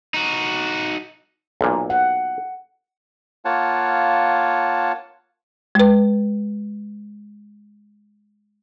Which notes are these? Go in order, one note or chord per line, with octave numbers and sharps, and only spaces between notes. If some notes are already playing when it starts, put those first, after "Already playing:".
D#4 F#4
B1 A#2
F#5
A#3 F4 C#5 F#5 A5
G#3 B4